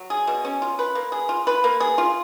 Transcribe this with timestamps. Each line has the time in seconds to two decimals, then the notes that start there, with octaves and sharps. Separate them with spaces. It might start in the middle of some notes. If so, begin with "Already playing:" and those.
Already playing: F#3
0.10 G#4
0.27 B2
0.45 C#4
0.62 F4
0.79 B4
0.95 A#3
1.12 G#4
1.29 F4
1.47 B4
1.64 A#3
1.80 G#4
1.98 F4